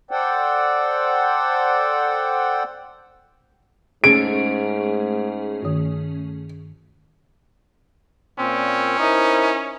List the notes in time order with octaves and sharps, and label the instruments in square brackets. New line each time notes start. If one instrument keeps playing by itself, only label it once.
[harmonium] A4 C5 D5 F#5 G5
[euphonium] G#2 [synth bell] A3 C#4 G#4 [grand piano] D7
[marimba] G2 D#3
[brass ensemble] A#2 [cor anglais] C4 [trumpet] C#4
[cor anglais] D#4 [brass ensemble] E4 A#4 C5